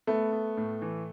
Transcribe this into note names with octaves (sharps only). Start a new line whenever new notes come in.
A3 B3
B3
A2
E3